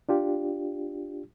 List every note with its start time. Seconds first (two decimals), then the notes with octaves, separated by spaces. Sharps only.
0.09 D4 F4 G4